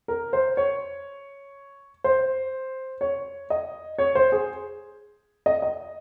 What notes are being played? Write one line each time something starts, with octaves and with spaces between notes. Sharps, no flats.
A#4
C5
C#5
C5
C#5
D#5
C#5
C5
G#4
D#5
D#5